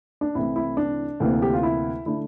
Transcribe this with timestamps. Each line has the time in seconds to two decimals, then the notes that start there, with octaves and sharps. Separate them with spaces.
0.21 D4
0.35 C2 C3 E3 A3 E4
0.56 E4
0.77 D4
1.20 D2 C3 E3 A#3
1.42 G4
1.53 F4
1.63 E4
2.06 D3 A3 D4 E4